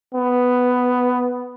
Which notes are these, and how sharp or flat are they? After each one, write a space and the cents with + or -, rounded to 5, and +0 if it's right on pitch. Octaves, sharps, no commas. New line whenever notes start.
B3 +5